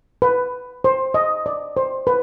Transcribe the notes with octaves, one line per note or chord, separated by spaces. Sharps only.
B4
C5
D#5
D5
C5
B4